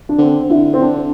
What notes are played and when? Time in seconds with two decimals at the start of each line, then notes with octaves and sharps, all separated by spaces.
0.09 D4
0.18 D3 C4
0.50 D3 E4
0.74 C4
0.82 D4